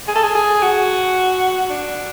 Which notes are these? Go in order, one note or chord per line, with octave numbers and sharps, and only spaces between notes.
G#4
A4
G#4
G#4
F#4
D4